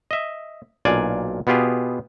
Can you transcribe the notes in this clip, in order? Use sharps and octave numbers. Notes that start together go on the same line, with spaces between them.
D#5 E5
B1 A#2 D4 D5 F5 G#5
B2 B3 F4 G4 G#4